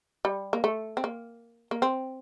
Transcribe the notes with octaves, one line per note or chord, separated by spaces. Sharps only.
G3
A#3
A3
C4
A#3
A#3
C4